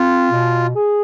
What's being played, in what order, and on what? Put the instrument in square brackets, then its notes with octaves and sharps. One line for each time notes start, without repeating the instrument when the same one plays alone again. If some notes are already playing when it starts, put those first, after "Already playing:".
Already playing: [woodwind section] C4 [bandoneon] F4
[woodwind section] B2
G#4